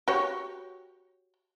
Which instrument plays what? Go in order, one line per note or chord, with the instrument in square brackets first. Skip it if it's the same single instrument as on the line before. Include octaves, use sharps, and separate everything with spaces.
[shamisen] F#4 G4 C#5